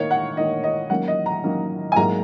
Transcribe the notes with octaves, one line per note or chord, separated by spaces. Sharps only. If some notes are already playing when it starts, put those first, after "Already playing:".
Already playing: D#3 A#3 D#4 C#5
F#5
D#3 A#3 D#4 D#5
D#5
D#3 F#3 A#3 C#4 F#5
D#5
A#5
D#3 F#3 A#3 C#4
G#5
G#2 F#3 A#3 A#5